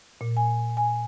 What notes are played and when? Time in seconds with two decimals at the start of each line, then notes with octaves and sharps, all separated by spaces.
0.21 A#2
0.37 G#5
0.77 G#5